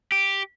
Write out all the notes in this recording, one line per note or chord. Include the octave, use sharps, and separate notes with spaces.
G4